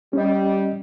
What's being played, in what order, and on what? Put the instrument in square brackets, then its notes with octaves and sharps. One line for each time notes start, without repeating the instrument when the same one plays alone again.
[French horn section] G3 [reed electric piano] C#4 D#5